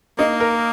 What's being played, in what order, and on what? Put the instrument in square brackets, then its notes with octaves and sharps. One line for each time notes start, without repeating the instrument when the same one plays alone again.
[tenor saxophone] A#3 [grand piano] D#4
[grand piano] A#4